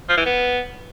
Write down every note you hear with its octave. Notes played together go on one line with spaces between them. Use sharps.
F3
E3
B3